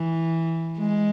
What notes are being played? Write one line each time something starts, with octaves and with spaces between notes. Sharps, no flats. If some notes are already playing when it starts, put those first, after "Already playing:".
Already playing: E3
G#3